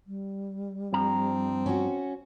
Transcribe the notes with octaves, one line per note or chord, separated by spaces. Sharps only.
G3
G2 F3 C4 A#5
C#4 F#4